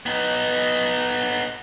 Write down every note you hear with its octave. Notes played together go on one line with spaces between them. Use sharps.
B3 D#4